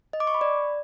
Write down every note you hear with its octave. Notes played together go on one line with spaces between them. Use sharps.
D#5
D6
C#6
B5
D5